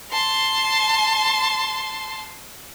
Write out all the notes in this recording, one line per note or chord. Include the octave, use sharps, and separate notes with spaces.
A5 C6